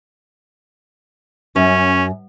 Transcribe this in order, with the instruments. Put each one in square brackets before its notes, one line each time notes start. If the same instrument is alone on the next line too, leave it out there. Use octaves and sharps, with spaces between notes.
[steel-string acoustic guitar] F#2 [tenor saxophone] C#4